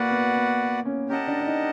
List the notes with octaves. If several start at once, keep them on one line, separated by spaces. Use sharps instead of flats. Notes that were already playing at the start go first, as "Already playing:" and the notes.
Already playing: A#3 F#4 B4 D5 F#5
B3
B3
C#4
C#4 G4 A#4 D#5 F#5 A5
D4
D4
D#4